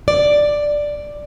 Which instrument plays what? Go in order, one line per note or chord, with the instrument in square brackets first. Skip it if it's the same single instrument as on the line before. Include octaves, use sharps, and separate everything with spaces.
[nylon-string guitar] D5